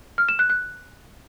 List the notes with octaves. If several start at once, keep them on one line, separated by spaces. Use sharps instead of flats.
F6
E7
F#6
F#6